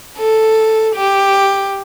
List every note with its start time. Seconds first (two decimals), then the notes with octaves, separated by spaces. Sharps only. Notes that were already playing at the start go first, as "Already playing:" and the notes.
0.18 A4
0.95 G4